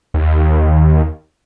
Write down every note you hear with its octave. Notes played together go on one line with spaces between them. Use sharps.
D#2